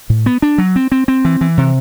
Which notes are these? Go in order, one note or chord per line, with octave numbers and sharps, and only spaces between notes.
A2
B3
D4
F#3
C4
C4
C4
E3
E3
C3